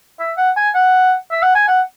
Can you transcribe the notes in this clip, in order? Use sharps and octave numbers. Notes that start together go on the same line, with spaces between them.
E5
F#5
G#5
F#5
E5
F#5
G#5
F#5